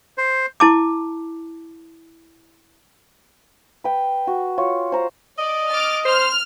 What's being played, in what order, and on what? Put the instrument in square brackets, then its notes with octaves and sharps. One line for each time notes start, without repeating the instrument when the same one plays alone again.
[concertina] C5
[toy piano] E4 A5 D6
[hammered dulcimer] B4 G5
F#4
F4 C#5
C5 A#5 C6
[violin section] D5 [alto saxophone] D#5
[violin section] D6 F6 A6
[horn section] C5 [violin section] F6